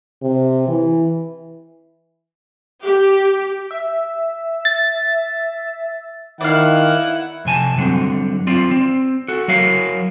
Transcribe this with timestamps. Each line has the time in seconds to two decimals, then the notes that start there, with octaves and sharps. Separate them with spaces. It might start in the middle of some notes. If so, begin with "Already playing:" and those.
0.22 C3
0.68 E3
2.85 G4
3.71 E5
4.65 A6
6.41 D#3 E4 D5 F5 F#5
7.45 F2 C3 G#5 A5
7.76 C#2 G2 D3 F#3 C4
8.47 C4 F4 D5
8.71 C4
9.28 F#4 A4
9.48 F#3 F#4 A#4 C#5 F5